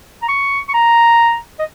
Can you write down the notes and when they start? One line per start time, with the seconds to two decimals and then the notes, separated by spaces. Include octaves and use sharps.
0.22 A#5
0.29 C#6
0.69 C#6
0.74 A#5
1.59 D#5